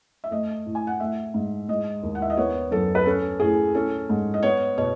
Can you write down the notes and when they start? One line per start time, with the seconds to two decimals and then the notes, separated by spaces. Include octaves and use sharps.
0.24 E5
0.31 A3 D#5
0.66 A2
0.75 G#5
0.87 F#5
1.00 A3 E5
1.34 G#2
1.68 G#3 D#5
2.03 D#2
2.15 F#5
2.22 E5
2.30 D#5
2.37 B3 C#5
2.71 F#2 A4
2.95 B4
3.06 C#4 A4
3.40 A2 G#4
3.75 C#4 A4
4.09 G#2
4.34 D#5
4.43 B3 C#5
4.78 B2 C#5